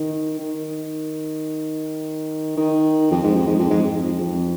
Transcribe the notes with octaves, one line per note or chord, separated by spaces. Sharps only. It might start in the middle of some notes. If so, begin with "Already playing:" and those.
Already playing: D#3
D#3
D#3
F2
G#2
F2
G#2
F2
G#2
F2
F2